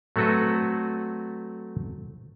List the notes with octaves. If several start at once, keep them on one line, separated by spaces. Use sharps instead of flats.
F#3 A3 C4 F#4 A4 B4